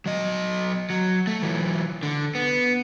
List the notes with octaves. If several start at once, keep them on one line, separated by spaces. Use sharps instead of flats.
F#3 D#5
F#3
A3
E3 F#3
D3
B3